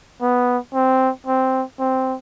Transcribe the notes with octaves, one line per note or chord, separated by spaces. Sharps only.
B3
C4
C4
C4